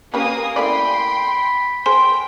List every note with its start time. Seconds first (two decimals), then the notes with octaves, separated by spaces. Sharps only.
0.14 A#3 C#4 G4 B4 G#5 D#6
0.56 A3 E4 D5 G5 B5 C6
1.86 G#4 A#4 C5 G5 C6